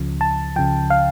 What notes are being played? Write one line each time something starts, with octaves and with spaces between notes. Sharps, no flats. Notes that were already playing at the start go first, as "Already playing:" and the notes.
Already playing: C#2 C#3 F3
A5
C#2 C#3 F3 G5
F5